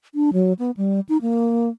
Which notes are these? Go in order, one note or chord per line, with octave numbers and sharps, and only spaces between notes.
D4
F#3
B3
G3
D#4
A#3